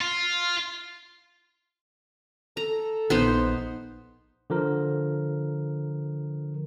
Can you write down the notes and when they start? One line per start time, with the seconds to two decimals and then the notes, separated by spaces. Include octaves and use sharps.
0.01 F4
2.57 A4 A#5
3.10 A#1 B3 D#4 C5
4.50 D3 F3 A#4